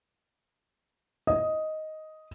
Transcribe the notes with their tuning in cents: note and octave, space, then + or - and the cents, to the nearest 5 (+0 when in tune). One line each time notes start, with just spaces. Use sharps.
D#5 +5